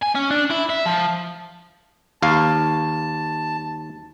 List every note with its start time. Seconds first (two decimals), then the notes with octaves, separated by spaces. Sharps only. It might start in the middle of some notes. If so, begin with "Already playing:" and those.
0.02 G#5
0.15 C#4
0.31 D4
0.51 E4
0.70 E5
0.86 F3
2.22 D#2 F5 A5